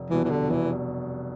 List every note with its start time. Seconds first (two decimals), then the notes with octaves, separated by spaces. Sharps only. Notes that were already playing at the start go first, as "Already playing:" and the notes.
Already playing: F1
0.10 E2 B2 E3 G3 D4
0.24 E3
0.30 D3
0.50 F1 E3